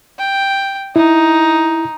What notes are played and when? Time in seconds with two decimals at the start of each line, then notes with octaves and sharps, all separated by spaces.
0.18 G5
0.96 D#4 E4